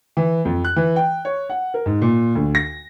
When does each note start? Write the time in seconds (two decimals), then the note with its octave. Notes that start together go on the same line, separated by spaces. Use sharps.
0.17 E3
0.45 F2
0.64 F#6
0.76 E3
0.96 G5
1.25 C#5
1.50 F#5
1.74 A#4
1.86 G#2
2.02 A#2
2.35 D2
2.55 A#6